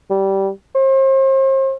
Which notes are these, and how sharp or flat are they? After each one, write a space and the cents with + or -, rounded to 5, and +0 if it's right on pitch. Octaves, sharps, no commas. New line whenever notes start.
G3 -15
C5 +40